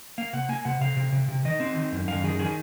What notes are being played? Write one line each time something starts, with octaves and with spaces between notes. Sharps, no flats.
A#3 F5
C3 F#5
A#3 G#5
C3 F#5
C3 F5
C3
C3
C3
D#3 D#5
C4
D#3
F#2
F#2 F5
D#3 G#4
D#3 G#4